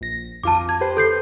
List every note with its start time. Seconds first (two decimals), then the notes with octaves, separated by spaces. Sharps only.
0.01 A#1 A#6
0.43 F2 F4 A5 D6 D#7
0.69 G#6
0.81 G4 B4 C5
0.97 A4 G6 C7